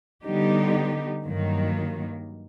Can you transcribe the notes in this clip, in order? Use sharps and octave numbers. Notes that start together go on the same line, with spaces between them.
D3 G3 B3 D#4 G4
G2 D#3 F#3 A#3